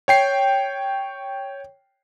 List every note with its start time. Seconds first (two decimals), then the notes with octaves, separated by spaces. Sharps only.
0.08 C#5 G5 C7